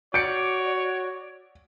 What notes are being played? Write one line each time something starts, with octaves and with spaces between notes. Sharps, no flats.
F#4 C#5 D5 G6 C#7